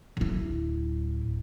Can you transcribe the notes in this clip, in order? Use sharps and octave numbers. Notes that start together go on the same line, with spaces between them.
D1 E4